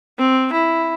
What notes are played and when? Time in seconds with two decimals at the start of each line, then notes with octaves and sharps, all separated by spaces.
0.19 C4
0.52 E4